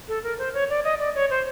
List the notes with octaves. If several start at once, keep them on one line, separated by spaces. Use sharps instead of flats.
A4
A#4
C5
C#5
D5
D#5
D5
C#5
C5